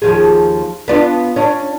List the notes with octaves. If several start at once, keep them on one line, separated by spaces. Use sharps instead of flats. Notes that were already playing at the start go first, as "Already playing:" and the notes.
D#2 F3 G#4
B3 D4 F4
C#4 D4